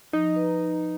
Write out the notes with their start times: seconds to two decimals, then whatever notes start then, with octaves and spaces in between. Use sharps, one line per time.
0.13 F3 D#4
0.36 B4